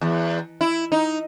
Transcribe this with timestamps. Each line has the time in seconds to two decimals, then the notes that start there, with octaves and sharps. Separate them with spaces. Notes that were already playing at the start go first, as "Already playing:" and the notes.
0.01 E2
0.61 E4
0.92 D#4